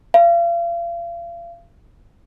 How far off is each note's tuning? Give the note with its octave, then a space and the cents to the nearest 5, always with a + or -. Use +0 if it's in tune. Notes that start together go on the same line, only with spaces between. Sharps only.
F5 -40